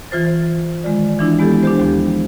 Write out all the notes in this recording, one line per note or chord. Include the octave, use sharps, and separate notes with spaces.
E3 F4 C5 A6
D#3 G#3 F4 D5
E3 D4 E4
G#3 B3 G4 A4
D4 G4 C5
D#2 F3